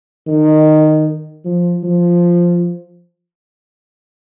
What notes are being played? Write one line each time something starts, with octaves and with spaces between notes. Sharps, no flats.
D#3
F3
F3